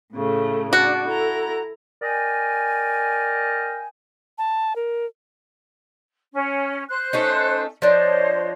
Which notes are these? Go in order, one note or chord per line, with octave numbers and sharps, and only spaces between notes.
A2 C#3 A3
D4 F#4
E4 A4 A#5
A#4 D5 D#5 G5 G#5
A5
A#4
C#4
C5 F#6
A3 C#4 D#4
F3 D4 C5 C#5 D#5